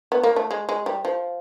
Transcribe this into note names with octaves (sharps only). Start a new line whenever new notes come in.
B3
A#3
A3
G#3
G#3
G3
F3